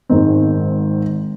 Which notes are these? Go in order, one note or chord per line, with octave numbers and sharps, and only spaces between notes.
G#1 G#2 D#3 G#3 C4